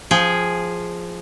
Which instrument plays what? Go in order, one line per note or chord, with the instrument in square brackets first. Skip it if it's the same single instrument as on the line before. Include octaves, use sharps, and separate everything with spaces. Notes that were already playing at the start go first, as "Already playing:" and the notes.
[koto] F3 G#4 G5